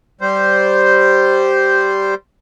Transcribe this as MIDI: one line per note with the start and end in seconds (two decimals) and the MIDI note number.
0.21 2.15 55
0.21 2.15 72